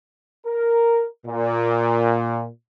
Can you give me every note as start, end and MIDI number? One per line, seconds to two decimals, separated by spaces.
0.46 1.05 70
1.26 2.46 46